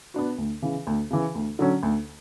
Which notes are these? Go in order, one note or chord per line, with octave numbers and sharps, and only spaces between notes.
B3 D4 F#4
D2
C#3 E3
D2
C#3 E3
D2
D3 F#3 C#4
D2